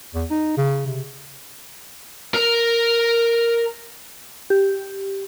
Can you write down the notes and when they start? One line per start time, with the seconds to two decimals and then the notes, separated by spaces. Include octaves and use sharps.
0.15 E2
0.31 D#4
0.57 C#3
0.86 C3
2.34 A#4 A#5
4.50 G4